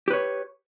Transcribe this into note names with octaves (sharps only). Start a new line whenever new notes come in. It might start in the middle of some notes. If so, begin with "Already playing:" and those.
G4 B4 C#5